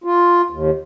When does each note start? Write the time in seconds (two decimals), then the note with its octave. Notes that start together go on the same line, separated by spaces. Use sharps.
0.04 F4
0.50 D#2